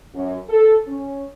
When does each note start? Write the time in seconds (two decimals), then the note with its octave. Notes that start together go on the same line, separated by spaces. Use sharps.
0.14 F#2
0.49 A4
0.87 C#4